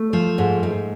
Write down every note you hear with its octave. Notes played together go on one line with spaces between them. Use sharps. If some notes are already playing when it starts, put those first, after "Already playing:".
Already playing: A3
F3
G#2
G#2